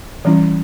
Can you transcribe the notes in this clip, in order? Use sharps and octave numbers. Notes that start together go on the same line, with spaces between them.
E3 G3 C#4 E4